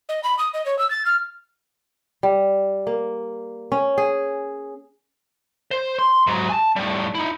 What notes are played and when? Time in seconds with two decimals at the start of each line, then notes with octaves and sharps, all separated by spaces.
0.09 D#5
0.24 B5
0.39 D#6
0.54 D#5
0.66 C#5
0.79 E6
0.91 A6
1.05 F6
2.23 G3
2.87 A#3
3.72 C#4
3.98 G#4
5.71 C5
5.99 C6
6.27 G#2 F#3
6.49 G#5 A5
6.76 A2 G3
7.15 D#4 E4